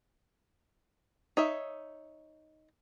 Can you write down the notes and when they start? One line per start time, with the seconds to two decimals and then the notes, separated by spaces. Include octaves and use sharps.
1.37 D#4 C#5 E5